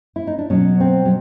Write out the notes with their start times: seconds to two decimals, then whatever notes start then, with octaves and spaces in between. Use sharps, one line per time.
0.16 E4
0.27 D#4
0.38 D4
0.50 B2 F#3 C#4
0.80 C4
1.05 F#3